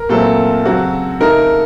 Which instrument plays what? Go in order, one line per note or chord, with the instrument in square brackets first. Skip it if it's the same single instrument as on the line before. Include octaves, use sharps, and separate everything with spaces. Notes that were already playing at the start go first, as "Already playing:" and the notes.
Already playing: [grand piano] A#4
[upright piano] A#2 F#3 A3 C4 [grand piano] A4
[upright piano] C#3 F#3 C4 F#4
[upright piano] C#3 A3 D#4 A4 [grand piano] A#4